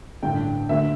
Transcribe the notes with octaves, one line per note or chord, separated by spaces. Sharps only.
A1 G2 D3 G5
D2 D3 E5